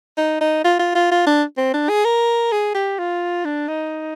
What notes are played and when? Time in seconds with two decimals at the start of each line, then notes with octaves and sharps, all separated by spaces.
0.17 D#4
0.41 D#4
0.64 F4
0.79 F4
0.95 F4
1.11 F4
1.27 D4
1.57 C4
1.74 D4
1.89 G#4
2.05 A#4
2.52 G#4
2.75 G4
2.99 F4
3.45 D4
3.68 D#4